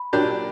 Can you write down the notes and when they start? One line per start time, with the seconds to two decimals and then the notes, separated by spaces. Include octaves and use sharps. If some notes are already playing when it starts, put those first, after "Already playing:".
Already playing: B5
0.13 A#2 F#3 A#3 D4 G4